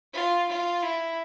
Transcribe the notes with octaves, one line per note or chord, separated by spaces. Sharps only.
F4
F4
E4